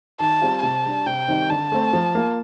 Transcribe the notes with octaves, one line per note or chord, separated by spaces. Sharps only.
D#3 A5
G3 C4 F4
C3 A5
G3 D4
C3 G5
D#3 G3 C4 D#4
D3 A5
A3 C4
F3
A#3 F4